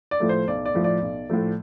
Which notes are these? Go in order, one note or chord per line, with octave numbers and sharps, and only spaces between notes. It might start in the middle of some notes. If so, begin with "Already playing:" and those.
D5
A2 F3 A3
C5
B1 D5
D5
A2 F3 A3
D5
B1
A2 F3 A3